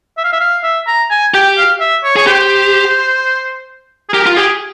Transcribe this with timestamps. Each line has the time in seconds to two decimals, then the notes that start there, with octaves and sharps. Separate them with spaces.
0.18 E5
0.24 F5
0.33 E5
0.40 F5
0.64 E5
0.87 A#5
1.11 G#5
1.34 G4 G5
1.58 F5
1.80 E5
2.04 C#5
2.16 G#4 C#5
2.27 G4 C5
4.09 G#4
4.13 G4 A#4
4.26 F4
4.36 G4 G#4